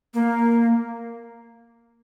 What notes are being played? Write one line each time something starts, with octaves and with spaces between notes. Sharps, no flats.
A#3